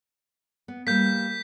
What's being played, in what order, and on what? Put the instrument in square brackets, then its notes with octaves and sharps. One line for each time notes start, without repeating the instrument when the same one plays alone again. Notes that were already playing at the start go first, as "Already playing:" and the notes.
[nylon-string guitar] B3
[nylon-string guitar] G3 A#3 [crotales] G6 B6